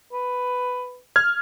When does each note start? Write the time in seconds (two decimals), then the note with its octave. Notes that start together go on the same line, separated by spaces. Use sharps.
0.13 B4
1.16 F6 G#6